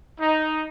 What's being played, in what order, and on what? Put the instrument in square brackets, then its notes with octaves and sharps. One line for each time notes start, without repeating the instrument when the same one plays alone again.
[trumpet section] D#4